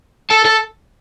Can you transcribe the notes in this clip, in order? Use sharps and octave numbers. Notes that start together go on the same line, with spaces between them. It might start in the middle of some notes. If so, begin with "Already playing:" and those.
A4 A5
A4 A5